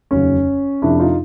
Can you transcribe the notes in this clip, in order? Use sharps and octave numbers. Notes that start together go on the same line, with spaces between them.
F1 D#2 C#3 F#3 C#4
F2 C3 F3 D4 E4
D#4 F4